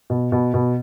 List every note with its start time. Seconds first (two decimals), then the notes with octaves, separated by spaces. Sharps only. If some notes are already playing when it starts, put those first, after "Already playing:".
0.10 B2
0.32 B2
0.54 B2